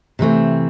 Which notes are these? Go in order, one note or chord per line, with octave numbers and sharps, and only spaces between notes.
C3 E3 A3 C4